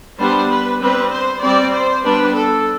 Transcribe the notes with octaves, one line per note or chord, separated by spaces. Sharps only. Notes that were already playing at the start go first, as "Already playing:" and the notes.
G3 B3 D4 C5
B4
G3 C4 B4
C5
G3 C4 D5
C5
G3 B3 D4 B4
A4